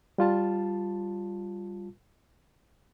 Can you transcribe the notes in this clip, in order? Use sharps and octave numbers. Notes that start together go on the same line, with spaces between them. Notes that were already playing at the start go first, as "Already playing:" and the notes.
G3 F4 A5